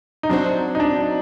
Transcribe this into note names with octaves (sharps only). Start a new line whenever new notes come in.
D#4
F#3 C4 D4 F#4 C5
D#4
D4